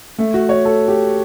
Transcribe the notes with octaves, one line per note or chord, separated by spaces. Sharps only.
A3
F#4
C#5
A4
G4